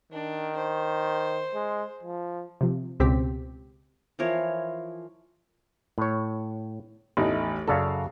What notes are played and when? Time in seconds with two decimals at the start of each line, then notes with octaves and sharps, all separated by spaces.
0.12 D#3 D4
0.56 C5
1.54 G#3
2.03 F3
2.61 C3 F3
3.00 C#2 B2 C4 G4 B6
4.19 E3 F3 A#4 C#5
5.98 A2 C#5
7.17 A1 E2 A3 D#4
7.68 F#2 C#3 F#4 A4 D5 F5